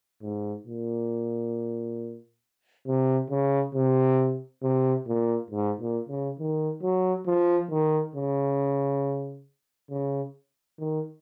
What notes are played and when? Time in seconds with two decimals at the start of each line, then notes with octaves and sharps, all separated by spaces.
0.22 G#2
0.66 A#2
2.87 C3
3.30 C#3
3.75 C3
4.63 C3
5.07 A#2
5.50 G#2
5.80 A#2
6.09 C#3
6.39 D#3
6.82 F#3
7.27 F3
7.70 D#3
8.15 C#3
9.91 C#3
10.79 D#3